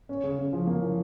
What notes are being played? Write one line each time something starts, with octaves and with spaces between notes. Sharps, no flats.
C#4
C#3
C#3
F3
A#3
F3